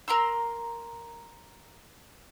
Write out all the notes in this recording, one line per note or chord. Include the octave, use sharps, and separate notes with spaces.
A#4 A#5 C6 E6